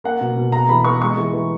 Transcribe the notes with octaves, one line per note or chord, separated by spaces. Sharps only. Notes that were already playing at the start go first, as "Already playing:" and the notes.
A#3 F#5
B2
B2
B3 A#5
E3 B5
B3 C#6
G#3 C#6
E3
E3